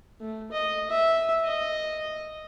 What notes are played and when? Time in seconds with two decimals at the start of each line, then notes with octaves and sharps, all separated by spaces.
0.20 A3
0.52 D#5
0.90 E5
1.44 D#5